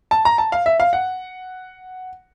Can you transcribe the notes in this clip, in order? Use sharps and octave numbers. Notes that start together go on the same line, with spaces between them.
A5
A#5
A5
F5
E5
F5
F#5